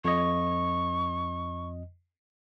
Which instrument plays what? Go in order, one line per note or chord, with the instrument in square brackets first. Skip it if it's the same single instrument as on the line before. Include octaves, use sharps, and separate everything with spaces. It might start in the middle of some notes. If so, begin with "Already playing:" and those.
[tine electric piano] F2 D#5 [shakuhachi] C#6